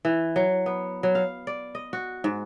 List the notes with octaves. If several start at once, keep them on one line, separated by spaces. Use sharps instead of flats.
E3
F#3
B3
F#3
F5
D5
D#5
F#4
G#2